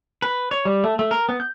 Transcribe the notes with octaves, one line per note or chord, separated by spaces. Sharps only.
B4
C#5
G3
A3
A3
A#4
B3
G6